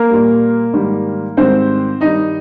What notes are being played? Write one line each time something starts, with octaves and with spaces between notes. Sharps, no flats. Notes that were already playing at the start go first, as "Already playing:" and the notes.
Already playing: A#3 A#4
A#2 G3
G#2 D#3 G3
G#2 D#3 G3 C4 C5
G2 D#3 G3 D#4 D#5